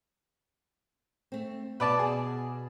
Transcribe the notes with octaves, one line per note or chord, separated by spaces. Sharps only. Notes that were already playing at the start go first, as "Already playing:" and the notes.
A3 C4
B2 B4 D5 A5
G#4